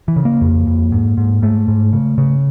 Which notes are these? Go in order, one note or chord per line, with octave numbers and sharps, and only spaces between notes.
E3
C#3
A#3
F2
F2
G#2
G#2
G#2 A3
G#2
C#3
C#3